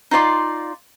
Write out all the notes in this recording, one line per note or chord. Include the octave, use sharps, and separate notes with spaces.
D#4 F4 D5 C6